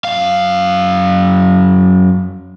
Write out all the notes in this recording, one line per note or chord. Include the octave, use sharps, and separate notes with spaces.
F#2 F5